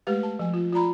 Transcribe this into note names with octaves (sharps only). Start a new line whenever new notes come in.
G#3 A3 G4 B4 F5
A5
F3 G#5
F4
F4 D5 A#5 B5